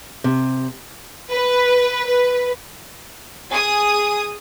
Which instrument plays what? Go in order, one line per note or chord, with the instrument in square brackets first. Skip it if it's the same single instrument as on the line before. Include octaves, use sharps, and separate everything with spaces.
[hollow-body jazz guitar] C3
[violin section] B4
B4
G#4 D#6